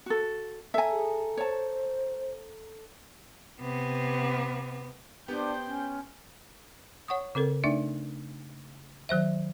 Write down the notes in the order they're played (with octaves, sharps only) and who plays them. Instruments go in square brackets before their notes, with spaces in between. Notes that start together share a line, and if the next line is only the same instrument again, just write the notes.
[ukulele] F#4 A4
[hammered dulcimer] A4 A#5 [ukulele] E5 G#5
[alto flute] G#4
[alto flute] C5 [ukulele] C#5 A5
[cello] C3 B3
[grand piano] B3 G4 [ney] D4 [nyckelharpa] C5 G5
[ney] C#4
[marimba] C#5 F#5 C#6 D#6
C#3 C4 A4 A#4
A3 D4 D#4 D5 E5
D#3 F#3 C5 E5